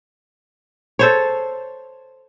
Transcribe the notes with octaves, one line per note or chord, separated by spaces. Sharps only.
A4 C5 C#5